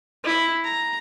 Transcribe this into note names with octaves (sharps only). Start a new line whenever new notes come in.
E4
A#5